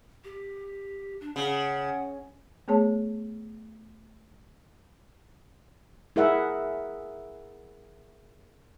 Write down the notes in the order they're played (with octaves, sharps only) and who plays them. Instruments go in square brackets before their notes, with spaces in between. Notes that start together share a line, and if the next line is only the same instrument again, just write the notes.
[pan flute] G4
D4
[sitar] C#3 [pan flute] F#5
[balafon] A3 B3 G#4 C#5 A5
[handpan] E4 G#4 A#4 E5 F#5